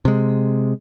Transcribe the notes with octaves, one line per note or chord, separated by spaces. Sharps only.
C3 G#3